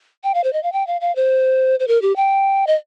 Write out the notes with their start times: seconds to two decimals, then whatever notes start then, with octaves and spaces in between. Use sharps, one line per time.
0.24 G5
0.34 F5
0.44 C5
0.53 D#5
0.63 F5
0.72 G5
0.87 F5
1.01 F5
1.16 C5
1.80 C5
1.88 A#4
2.02 G4
2.16 G5
2.67 D#5